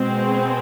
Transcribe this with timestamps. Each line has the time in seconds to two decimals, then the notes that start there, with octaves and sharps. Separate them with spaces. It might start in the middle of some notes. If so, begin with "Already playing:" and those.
Already playing: B2 G#3 C4